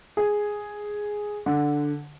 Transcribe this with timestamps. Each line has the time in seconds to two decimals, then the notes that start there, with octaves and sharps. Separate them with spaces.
0.17 G#4
1.46 D3